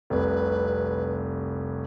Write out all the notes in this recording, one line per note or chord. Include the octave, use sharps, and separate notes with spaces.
F1 C2 B4